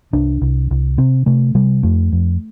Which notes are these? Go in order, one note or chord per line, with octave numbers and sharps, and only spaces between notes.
C2 D4
C2
C2
C3 C4
C3 A3
C3 G3
F2 A3
F2